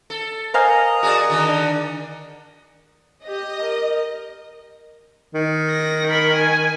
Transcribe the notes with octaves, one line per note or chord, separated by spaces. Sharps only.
A4
A#4 C5 D#5 F5 G#5 A#5
F#4 G#4 D5
D3 D#3 D4
G4 D#5
A#4
D#3
A#6
A#4 B5
G#5